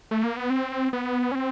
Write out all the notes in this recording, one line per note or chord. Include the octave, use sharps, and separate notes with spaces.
A3
A#3
B3
C4
B3
C#4
C4